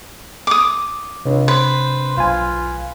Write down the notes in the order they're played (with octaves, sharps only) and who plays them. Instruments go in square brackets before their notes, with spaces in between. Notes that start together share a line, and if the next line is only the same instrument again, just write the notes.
[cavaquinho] D6 D#6
[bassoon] C#2 [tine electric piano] C3 D4
[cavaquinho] B4 [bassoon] C5
[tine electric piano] B1 G#5 [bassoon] F4